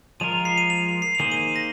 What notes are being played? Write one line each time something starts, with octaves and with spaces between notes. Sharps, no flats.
F3 G#3 F4 A#4 D#7
C7
D#7
F7
C7
F7
D#3 A#3 G#4 C5 D#7
D#7
A#6